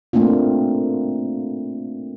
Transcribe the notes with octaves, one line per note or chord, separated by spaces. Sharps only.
A3 A#3 C4 D4 F4